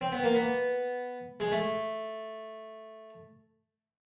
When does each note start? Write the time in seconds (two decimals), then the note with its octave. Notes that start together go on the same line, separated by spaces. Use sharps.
0.01 C4
0.12 B3
0.24 A#3
0.34 B3
1.40 G#3
1.52 A3